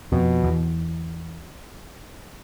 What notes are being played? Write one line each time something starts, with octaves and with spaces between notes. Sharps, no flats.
F2 B2
E2